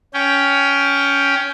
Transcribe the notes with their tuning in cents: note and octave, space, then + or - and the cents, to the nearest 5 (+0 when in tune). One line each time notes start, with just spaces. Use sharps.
C#4 +15 G5 +0